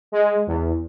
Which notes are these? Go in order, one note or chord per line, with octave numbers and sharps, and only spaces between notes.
G#3
E2